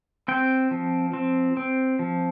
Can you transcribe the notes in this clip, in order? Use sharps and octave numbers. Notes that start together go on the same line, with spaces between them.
C4 G5
F3
C4
C4
F3